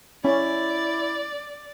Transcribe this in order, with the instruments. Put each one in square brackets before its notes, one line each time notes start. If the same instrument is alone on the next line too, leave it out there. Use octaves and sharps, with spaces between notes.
[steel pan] C#4 [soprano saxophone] E4 [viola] D5